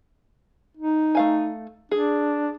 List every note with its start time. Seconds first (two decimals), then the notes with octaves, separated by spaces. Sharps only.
0.77 D#4
1.15 A3 F5 G#5
1.91 D4 G#4